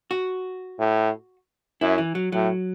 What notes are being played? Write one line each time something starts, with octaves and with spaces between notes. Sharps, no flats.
F#4
A2
F#2 E4
E3
F#3
A2 F#3